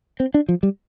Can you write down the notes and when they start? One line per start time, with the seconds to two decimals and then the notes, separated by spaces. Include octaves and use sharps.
0.20 C4
0.34 D4
0.49 F3
0.63 G3